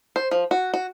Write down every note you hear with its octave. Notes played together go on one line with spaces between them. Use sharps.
C5
F3
F#4
F#4